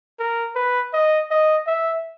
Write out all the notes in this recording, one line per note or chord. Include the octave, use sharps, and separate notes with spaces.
A#4
B4
D#5
D#5
E5